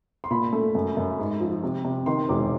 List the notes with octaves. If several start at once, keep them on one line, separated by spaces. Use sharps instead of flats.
C6
A#2 B5
A3
F#2
F#2
G#2
F3
C3
C3
D#3 C6
E1 D6